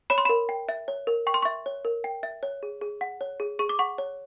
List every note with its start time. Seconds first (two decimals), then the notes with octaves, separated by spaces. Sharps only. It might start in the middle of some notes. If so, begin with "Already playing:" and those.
0.10 C#5 B5
0.18 C6
0.25 A#4 B5
0.49 G5
0.69 E5
0.88 C#5
1.07 A#4
1.27 G5 C#6
1.34 C6
1.42 E5 C#6
1.66 C#5
1.85 A#4
2.04 G5
2.23 E5
2.43 C#5
2.63 G#4
2.82 G#4
3.01 F#5
3.21 C#5
3.40 G#4
3.59 G#4 C#6
3.69 D6
3.79 F#5 C#6
3.98 C#5